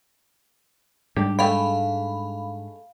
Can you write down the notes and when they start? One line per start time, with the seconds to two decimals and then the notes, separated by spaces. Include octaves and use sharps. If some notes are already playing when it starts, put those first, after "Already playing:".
1.17 G#2 G3 D4 G4
1.39 G#3 A3 F5 G5 B5